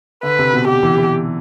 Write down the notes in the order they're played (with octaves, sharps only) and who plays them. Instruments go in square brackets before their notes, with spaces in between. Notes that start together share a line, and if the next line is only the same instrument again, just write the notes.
[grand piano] D3 [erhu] B4
[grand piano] C3
B2
[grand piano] B2 [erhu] G4
[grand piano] E3
E3